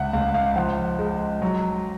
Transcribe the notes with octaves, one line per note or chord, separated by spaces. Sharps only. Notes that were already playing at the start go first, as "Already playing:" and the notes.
Already playing: C#2 E5 F#5
C#2 F5
F5
F3 F#5
G#3
F#3